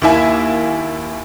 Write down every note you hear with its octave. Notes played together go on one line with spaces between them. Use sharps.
D#2 A#3 E4 E5 G#5